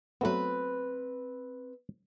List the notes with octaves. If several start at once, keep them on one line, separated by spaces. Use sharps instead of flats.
F#3 A3 B3 C4 B4